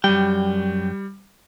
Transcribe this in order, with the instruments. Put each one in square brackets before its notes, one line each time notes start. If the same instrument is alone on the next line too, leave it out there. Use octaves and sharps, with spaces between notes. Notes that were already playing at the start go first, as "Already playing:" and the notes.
[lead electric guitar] F#2 G5 [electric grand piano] G3